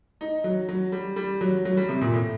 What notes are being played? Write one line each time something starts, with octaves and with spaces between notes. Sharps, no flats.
D#4
F#3
F#3
G3
G3
F#3
F#3
G3
C3
A#2
A2